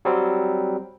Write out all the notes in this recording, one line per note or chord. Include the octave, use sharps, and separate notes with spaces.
F#3 G3 C4